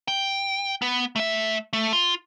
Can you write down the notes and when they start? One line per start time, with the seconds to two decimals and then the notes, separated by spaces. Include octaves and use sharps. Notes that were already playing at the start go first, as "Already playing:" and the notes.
0.08 G5
0.82 B3
1.16 A3 E5
1.73 A3
1.93 F4